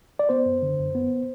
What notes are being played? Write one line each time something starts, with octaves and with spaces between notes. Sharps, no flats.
D5
B3 C5
F#2
D3
F#2
B3